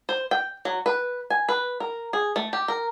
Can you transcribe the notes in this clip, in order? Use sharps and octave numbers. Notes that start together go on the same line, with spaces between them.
C5
G5
F#3
B4
G#5
B4
A#4
G#4
A3
G4
A#4